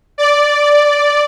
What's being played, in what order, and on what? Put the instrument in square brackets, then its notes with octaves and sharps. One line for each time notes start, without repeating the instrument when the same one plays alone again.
[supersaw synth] D5